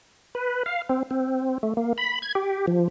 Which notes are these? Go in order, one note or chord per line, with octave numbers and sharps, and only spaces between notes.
B4
F5
C4
C4
A3
A#3
B5
G#6
G4
F3